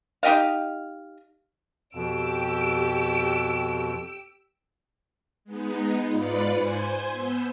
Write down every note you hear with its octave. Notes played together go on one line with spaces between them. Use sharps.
D#4 G4 D#5 F5
F2 B2 G4 E6 D7
G#3 B3 D#4
G#2 F4 B4 D5 B5 C#7
C5 G#5 C6
B3 E6 G6